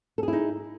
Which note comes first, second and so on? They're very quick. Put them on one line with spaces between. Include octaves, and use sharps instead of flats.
A4 G#4 E4 D#4